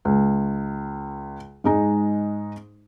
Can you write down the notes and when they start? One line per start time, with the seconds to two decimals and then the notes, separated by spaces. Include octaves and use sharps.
0.05 C#2
1.64 G#2 G#3 D#4